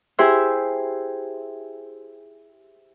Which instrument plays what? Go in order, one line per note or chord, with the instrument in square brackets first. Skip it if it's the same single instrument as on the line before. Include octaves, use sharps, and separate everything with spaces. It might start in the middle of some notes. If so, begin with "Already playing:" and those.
[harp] E4 G4 G#4 C5 E5